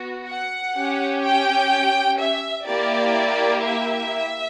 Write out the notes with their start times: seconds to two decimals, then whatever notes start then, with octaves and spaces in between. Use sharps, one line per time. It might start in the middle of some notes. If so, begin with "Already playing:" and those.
Already playing: B3 F#4
0.26 F#5
0.75 C#4 G4
1.23 G5
2.19 E5
2.66 A#3 E4 G4 D5
3.62 E5